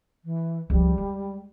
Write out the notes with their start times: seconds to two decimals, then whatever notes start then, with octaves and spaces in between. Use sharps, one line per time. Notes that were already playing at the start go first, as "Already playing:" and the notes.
0.24 E3
0.70 C#2 F3 G3
0.98 G#3